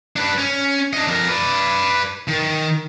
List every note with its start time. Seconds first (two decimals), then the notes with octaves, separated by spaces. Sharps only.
0.16 D4 B4
0.38 C#4
0.93 D4 D#5
1.08 F2 A#4
1.28 B4 D5
2.28 D#3